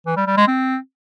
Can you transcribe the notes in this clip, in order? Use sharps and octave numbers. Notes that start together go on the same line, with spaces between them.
E3
G3
G3
G#3
C4